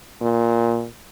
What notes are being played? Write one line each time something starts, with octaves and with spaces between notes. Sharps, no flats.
A#2